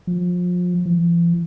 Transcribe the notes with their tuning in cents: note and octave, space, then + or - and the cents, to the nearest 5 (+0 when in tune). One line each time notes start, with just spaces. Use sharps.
F3 +30
F3 -45